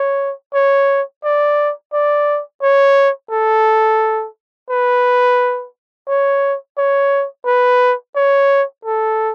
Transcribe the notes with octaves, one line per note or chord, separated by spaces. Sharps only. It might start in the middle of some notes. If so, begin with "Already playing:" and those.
Already playing: C#5
C#5
D5
D5
C#5
A4
B4
C#5
C#5
B4
C#5
A4